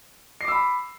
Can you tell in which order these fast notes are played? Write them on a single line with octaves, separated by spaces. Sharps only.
C7 D6 E6 B5